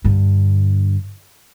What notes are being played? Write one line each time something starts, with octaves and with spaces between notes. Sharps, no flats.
G2 D3